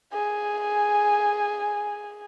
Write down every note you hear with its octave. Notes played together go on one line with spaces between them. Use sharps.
G#4 G#5